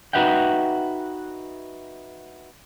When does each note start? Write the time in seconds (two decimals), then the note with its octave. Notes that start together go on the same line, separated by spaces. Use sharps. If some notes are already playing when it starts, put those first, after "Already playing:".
0.13 D#4 F#4 B4 E5 F#5 G5